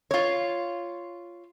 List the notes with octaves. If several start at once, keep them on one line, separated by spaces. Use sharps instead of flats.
F4 C#5